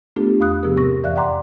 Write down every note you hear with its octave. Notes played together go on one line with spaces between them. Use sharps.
A3 B3 D4 F4 G4 A4
E2 F5 B5 D#6 F#6
C3 F3 B3 G4 G#4 A#4
G#2 C3 C4 A#4 C#6 A#6
F2 E3 D5 E5 F5 F#6
D5 F#5 G5 A#5 C6 D6